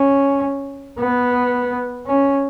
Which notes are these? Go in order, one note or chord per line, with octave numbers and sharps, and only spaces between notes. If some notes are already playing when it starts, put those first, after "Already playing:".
Already playing: C#4
B3
C#4